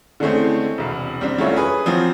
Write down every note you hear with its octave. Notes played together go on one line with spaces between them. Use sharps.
D3 E3 G#3 A3 C4 C#4
E1 C2
G3 C4 D4
F#3 G3 A3 C#4 F4 E5
G#4 B4
F3 F#3 C4